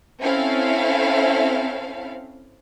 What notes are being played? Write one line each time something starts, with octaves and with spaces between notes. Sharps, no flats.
C4 C#4 E4 A4 F5